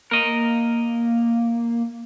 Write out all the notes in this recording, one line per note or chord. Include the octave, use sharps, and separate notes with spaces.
A#3 A#4 D#5